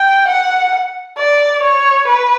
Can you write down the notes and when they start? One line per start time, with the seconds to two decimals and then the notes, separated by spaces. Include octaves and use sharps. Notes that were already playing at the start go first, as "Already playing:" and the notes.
Already playing: G5
0.28 F#5
1.18 D5
1.63 C#5
2.08 B4